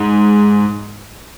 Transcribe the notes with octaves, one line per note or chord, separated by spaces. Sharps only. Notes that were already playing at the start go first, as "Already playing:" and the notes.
Already playing: G#2